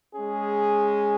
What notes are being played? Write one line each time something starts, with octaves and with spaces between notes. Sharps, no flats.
G#3 C#4 G#4